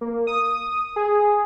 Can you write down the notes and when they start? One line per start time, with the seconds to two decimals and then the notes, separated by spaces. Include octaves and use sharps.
0.01 A#3
0.27 D#6
0.96 G#4